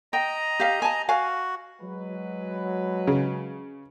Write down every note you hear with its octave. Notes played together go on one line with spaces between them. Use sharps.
D#5 G5 A#5
G4 F5
G#5 A5
F#4 F5 G#5
F#3 G#3 B4
C#3